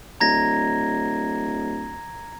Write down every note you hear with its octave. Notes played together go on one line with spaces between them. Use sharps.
D1 A#5 G#6 A#6